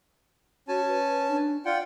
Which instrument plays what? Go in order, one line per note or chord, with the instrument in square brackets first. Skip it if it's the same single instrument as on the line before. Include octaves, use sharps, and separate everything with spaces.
[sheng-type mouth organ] C#4 G#5 A5 [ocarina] F#4
[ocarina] B4
D4
[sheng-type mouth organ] F4 F#5 G5 [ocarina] D5